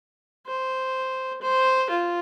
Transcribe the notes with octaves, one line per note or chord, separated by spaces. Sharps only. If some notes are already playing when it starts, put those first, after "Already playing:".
C5
C5
F4